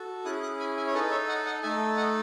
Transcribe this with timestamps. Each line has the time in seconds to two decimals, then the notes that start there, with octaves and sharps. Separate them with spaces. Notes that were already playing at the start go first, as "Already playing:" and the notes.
Already playing: F#4 A4
0.25 C#4 E4 G#4 D#6 F#6
0.43 D#6 F#6
0.59 G#5 B5
0.77 E5 G#5
0.87 C#5
0.94 D#4 A4 B4 D#5
1.11 C#5 E5
1.28 D#5 F#5
1.46 D#5 F#5
1.63 A3 D#4 A4 E5 G#5
1.97 D#5 F#5